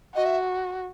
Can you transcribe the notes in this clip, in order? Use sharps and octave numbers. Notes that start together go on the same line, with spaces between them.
F#4 D#5
E5